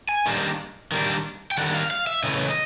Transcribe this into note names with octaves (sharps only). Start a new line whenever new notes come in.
G#5
D#3 G3 A#3 D4
D#3 G3 A#3 D4
G5
D#3 G3 A#3 D4 F#5
F5
F5
E5
C#3 E3 A3 C#4 E4 D#5